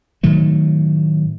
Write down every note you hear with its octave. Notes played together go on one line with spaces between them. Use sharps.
A2 D#3 F#3 A3